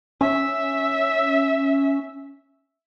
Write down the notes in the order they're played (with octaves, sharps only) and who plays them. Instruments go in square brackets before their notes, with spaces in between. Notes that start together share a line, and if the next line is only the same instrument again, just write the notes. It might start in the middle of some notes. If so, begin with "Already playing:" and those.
[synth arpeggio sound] C#4 [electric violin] E5